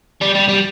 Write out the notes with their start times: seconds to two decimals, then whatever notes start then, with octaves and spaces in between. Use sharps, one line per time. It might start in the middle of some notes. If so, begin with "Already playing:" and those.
0.21 G3
0.35 G3
0.49 G3